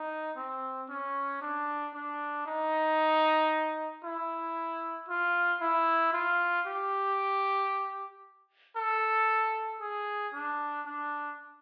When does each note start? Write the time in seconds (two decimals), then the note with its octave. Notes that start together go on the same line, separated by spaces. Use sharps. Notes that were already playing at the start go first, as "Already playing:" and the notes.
Already playing: D#4
0.36 C4
0.89 C#4
1.41 D4
1.94 D4
2.46 D#4
4.04 E4
5.09 F4
5.61 E4
6.13 F4
6.66 G4
8.77 A4
9.81 G#4
10.34 D4
10.86 D4